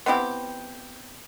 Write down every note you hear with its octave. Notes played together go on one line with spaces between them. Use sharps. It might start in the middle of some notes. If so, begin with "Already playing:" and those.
B3 C4 E4 G4